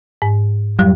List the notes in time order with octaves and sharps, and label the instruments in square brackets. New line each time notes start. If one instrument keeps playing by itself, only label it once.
[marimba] G#2
[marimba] F2 F#3 [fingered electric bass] G3